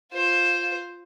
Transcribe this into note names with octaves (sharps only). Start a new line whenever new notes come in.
F4 C5